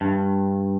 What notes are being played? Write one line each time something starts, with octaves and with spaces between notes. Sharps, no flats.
G2